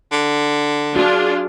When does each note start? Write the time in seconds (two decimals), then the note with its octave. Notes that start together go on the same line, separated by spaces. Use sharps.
0.12 D3
0.96 D4 F4 F#4 G#4